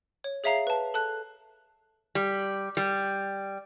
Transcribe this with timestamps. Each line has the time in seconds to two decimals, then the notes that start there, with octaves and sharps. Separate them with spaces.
0.24 C#5
0.44 G#4 C#5 E5 F5 A#5 C7
0.67 B4 A5
0.94 A4 A5 F#6
2.15 G3
2.77 G3